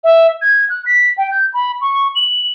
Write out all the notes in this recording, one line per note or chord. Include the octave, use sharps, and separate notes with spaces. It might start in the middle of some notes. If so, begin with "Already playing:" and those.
E5
G#6
F#6
B6
G5
G6
B5
C#6
F#7